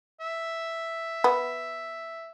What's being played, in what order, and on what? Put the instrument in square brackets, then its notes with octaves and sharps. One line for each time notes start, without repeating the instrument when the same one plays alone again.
[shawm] E5
[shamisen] B3